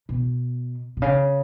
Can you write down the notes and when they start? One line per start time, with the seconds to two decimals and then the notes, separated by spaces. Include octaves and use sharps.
0.09 B2
0.97 B2
1.02 C#3